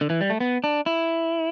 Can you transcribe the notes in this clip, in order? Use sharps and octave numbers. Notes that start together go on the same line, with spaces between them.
D3
E3
G3
A3
B3
D4
E4